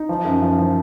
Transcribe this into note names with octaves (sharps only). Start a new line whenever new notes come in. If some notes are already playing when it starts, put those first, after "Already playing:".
Already playing: D#4
F3
F#2
F3
F3